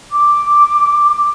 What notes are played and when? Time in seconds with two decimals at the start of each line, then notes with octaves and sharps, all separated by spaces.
0.11 D6